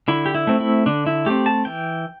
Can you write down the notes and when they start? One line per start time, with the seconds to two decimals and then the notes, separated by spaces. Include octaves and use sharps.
0.08 D3 E4
0.26 G4
0.35 E4
0.47 A3 C4
0.60 E4
0.86 D3 D4
1.07 E4
1.26 A3 C4 G4
1.46 A5
1.65 E3 G5